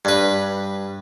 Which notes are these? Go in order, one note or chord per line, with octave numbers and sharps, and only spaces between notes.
G2 B4